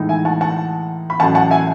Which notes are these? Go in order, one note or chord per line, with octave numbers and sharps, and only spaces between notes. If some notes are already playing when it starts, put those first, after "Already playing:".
Already playing: A2 E3 G#3 D#4
E5 G#5
F#5 A5
F#5 A5
B5
A1 A2 F#3 F#5 A5
F#5 A5
E5 G#5